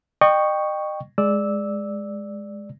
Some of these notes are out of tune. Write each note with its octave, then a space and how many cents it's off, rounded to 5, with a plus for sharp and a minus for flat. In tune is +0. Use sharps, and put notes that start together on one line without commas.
D#5 -35 G5 +0 C#6 +0
G#3 +0 D5 +0 E6 -10